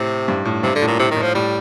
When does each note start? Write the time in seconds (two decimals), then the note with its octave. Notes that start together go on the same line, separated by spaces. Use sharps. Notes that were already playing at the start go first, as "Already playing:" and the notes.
Already playing: A2 C3
0.28 G2
0.45 A2
0.63 G2 C3
0.76 D3
0.82 A2
0.88 A#2
0.99 A2 C3
1.11 D#3
1.17 A2
1.23 F3
1.35 A2 G3